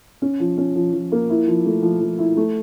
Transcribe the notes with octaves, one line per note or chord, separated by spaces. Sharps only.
C#4
F3
C#4
F3
F3
A#3
E4
F3
A3
F3
F3
E4
A3